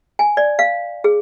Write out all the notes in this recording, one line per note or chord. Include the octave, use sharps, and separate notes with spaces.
G#5
D5
F5
G#4